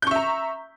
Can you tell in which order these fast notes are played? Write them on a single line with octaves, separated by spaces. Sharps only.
G6 C#6 E5 A#5